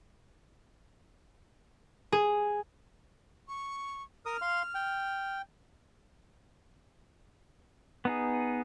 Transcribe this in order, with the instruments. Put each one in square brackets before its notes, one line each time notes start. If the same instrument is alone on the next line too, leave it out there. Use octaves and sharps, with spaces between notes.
[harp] G#4
[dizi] C#6
[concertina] A#4 D#6 [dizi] F6
[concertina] F5 C6
G5
[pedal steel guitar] B3 D#4 G#4